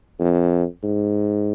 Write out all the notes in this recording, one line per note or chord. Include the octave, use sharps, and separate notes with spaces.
F2
G#2